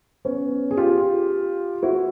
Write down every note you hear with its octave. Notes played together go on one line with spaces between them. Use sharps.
B3 C#4
G#4
F4 G4
E4 F#4